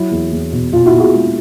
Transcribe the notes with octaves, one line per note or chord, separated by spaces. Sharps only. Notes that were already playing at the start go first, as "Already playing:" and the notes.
Already playing: F#3 E4
E2
E2
B2
B2 F4
E4 F#4
B2
F#4 G#4
G#3